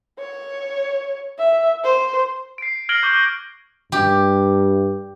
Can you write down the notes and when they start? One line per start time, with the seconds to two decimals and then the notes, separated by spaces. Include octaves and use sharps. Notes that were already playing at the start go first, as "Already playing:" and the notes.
0.19 C#5
1.39 E5
1.84 C5
2.58 C7 D7
2.89 F6 G#6 A#6 D7 F#7 G7
3.03 C#6 D6 F#6 G6
3.92 G2 G4